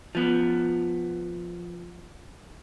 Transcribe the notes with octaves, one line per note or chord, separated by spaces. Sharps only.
F3 B3